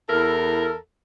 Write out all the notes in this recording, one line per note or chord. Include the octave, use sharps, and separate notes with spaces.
E2 E4 A4 A#4